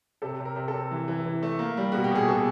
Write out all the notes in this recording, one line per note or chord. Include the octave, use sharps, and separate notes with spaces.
C3 A4
C3
A#4
C3
A4
C3
E3
E3
E3
A3
A#3
G3
B2 F#4
G4
B2 G#4
B2 A4